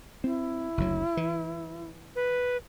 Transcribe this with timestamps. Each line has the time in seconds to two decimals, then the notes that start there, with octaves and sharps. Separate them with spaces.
0.24 C4 E4
0.78 F#1 D2 F#3
1.17 E3
2.16 B4